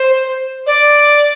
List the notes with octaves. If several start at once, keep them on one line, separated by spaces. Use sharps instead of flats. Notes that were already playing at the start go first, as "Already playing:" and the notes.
Already playing: C5
D5